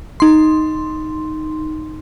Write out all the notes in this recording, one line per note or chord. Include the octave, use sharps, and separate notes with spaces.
D#4 C6